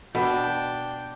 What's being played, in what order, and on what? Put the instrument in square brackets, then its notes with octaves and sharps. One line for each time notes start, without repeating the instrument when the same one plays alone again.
[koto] B2 [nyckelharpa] D4 G5